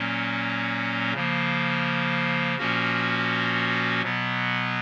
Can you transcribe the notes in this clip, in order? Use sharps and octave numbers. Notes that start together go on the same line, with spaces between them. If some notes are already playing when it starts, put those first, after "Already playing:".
Already playing: A#2 F#3 A#3 C#4
C#3 F3 A#3
A#2 F3 A#3 C#4 F#4
B2 F#3 B3